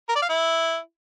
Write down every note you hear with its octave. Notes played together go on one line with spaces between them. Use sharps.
A#4
D5
F5
E4